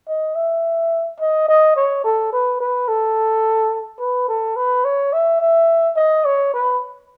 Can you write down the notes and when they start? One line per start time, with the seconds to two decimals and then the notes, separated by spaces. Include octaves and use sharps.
0.08 D#5
0.36 E5
1.20 D#5
1.48 D#5
1.76 C#5
2.04 A4
2.33 B4
2.61 B4
2.88 A4
4.00 B4
4.29 A4
4.56 B4
4.85 C#5
5.13 E5
5.41 E5
5.97 D#5
6.25 C#5
6.54 B4